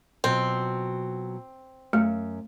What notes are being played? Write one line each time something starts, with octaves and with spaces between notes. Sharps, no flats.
B2 F#3 C4 F4
F#2 A3